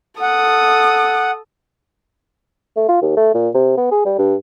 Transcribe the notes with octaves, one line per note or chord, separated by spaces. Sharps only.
A4 F#5 D#6
A3
F4
D#2
A3
A#2
C3
B3
G#4
G3
G2